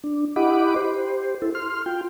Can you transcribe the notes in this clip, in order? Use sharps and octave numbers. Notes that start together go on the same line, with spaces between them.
D4
E4 G4 D#5 F#5 B5 D6
G4 C5
E4 A4
C6 F6
F4 G5